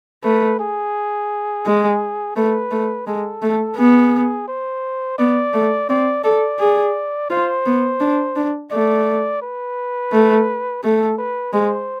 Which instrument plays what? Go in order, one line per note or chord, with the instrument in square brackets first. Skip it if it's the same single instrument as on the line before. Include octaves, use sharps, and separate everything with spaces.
[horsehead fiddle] A3 [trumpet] B4
[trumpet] G#4
[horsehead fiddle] G#3
[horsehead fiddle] A3 [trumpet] B4
[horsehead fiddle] A3
[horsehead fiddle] G#3 [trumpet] A4
[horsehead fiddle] A3
[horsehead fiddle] B3 [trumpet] G#4
[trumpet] C5
[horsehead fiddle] B3 [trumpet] D5
[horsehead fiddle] A3
[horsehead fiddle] C4 [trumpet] D5
[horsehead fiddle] A4 [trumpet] D5
[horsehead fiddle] G#4
[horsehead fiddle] F4 [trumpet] C5
[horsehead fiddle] B3
D4
D4
[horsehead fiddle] A3 [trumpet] D5
[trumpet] B4
[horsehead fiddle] A3
[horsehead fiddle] A3 [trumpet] A4
[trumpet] B4
[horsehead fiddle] G#3 [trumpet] C5